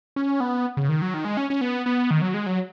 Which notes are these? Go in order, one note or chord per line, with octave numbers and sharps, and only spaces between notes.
C#4
B3
C#3
D#3
F#3
D#3
G#3
C#4
C#4
B3
B3
D#3
F#3
G#3
F#3